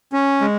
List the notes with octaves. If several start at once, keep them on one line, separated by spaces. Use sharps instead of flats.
C#4
G#3